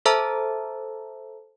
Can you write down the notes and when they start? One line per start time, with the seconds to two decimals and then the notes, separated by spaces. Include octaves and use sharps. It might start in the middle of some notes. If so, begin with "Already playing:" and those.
0.06 A4 C5 E5 A5 A#5 E6